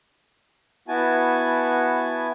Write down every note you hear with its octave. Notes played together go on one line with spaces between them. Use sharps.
B3 E4 F#4 G#5 A5